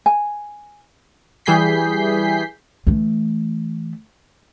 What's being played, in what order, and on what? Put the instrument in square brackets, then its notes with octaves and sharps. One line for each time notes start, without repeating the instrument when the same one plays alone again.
[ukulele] G#5
[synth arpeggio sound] E3 G3 G#4 G6 B6 C7
[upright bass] E3 A3